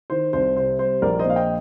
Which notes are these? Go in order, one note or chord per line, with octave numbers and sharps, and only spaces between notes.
D#3 C5
C2 C5
C3 C5
G3 C5
A#1 A#4 D5
C5 D#5
A#2 F5
D#5 G5